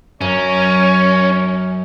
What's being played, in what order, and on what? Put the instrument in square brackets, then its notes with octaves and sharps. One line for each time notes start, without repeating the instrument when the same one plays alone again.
[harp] F#2 [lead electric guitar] C#4 [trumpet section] A#4 C#5